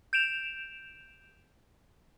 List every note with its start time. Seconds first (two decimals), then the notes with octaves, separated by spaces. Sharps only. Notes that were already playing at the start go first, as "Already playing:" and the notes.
0.13 G6 D7 E7 F7